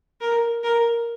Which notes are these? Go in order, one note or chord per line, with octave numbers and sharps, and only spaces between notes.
A#4
A#4